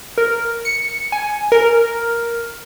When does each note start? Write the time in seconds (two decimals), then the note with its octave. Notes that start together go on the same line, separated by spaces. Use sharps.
0.18 A#4
0.65 C#7
1.12 G#5
1.52 A#4